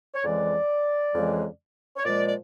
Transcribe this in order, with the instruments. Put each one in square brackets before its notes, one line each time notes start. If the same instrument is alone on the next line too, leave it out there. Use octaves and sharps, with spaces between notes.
[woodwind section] C#5
F2 C#3 E3 G#3 D5
F2 C#3 E3 G#3
C#5
A#2 F3 G#3 D5
D5